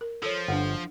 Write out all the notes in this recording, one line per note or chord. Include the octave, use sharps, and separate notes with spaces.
A#4
F3 A4 C#5
G1 D4 F#5